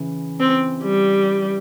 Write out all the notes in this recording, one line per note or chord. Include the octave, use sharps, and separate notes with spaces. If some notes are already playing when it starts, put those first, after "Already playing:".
Already playing: C#3 E3
C4
G3